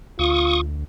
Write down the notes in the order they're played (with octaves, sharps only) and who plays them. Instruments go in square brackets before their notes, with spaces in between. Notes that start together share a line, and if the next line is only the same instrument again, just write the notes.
[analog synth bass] D2 [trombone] F4 [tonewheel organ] C#6 D#6